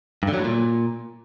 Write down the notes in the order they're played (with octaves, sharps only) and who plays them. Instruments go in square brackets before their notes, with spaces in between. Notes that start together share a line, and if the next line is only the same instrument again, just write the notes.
[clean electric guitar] G2
D3
F#3
A2
A#2